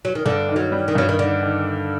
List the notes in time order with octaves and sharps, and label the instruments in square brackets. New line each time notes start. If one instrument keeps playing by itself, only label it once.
[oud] F#3
D#3
[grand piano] G2 [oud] D3
[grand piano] D#3
[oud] F#3
[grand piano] G3
[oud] D#3
[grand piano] G2 [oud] F#3
[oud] D#3
[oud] D3 [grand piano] D#3
[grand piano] D#3